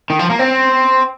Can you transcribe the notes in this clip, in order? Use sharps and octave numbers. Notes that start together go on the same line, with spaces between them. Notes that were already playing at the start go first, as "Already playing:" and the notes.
D#3
F3
A#3
C4